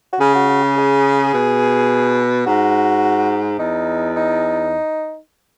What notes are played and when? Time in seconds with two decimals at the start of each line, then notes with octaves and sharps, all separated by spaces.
0.13 F#4
0.20 C#3 G#4
0.35 F#4
0.49 F#4
0.63 G#4
0.78 G#4
1.34 B2
2.46 G#2 F#4
3.59 E2 D#4
4.16 D#4